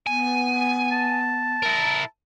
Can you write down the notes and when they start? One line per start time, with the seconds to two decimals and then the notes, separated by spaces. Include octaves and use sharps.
0.07 B3 G#5
0.92 A5
1.63 E4 A#4